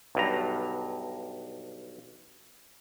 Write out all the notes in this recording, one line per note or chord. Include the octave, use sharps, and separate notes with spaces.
B1 G2 A#5